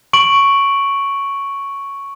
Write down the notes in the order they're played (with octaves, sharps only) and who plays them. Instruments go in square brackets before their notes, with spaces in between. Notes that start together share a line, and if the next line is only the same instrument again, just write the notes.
[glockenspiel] C#6 D7 F#7